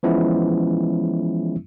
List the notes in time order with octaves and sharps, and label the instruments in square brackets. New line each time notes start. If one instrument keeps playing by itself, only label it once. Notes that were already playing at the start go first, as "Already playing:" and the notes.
[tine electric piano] E3 F3 G#3 B3 C#4 E4